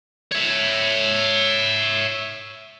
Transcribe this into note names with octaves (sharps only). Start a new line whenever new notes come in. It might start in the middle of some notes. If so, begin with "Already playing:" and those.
C#5 E5